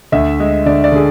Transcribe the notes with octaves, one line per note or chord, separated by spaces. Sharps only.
D2 E5
G#3
D3 D5
D5
D3 G#4